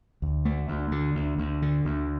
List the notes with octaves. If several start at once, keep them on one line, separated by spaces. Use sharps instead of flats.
D2
A3
D2
D3
D2
D2
D3
D2